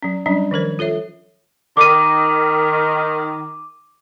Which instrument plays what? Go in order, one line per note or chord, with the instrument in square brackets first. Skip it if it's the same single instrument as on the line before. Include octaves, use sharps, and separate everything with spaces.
[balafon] F#3 C#4
F#3 G3 C#4 D4
D#3 F3 A#4 C5
F4 A4 C#5 E5
[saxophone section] D#3 [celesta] D6 D#7